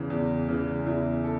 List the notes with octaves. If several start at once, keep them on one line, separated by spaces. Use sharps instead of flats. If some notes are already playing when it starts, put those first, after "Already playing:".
Already playing: E2 C#3 E3
E2
C#3 E3
E2 E4
A4